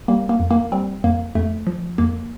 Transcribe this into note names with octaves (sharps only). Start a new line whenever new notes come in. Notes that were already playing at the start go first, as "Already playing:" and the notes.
G3 A#3
A#3
F2
A#3
G3 C4
F2 A#3
F2 A3
F3
F2 A#3